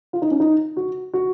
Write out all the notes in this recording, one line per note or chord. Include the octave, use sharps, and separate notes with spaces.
F4
D#4
C#4
D#4
F#4
F#4